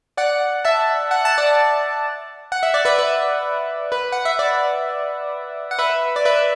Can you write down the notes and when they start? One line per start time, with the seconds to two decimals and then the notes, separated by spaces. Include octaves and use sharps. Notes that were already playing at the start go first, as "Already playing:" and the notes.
0.17 D5 F#5
0.65 E5 A5
1.11 F#5
1.25 A5
1.38 D5 F#5
2.52 F#5
2.63 E5
2.74 D5
2.85 B4 E5
2.99 B4 E5
3.92 B4
4.12 F#5
4.25 E5
4.39 D5
5.71 F#5
5.79 B4 E5
6.16 D5
6.25 B4 E5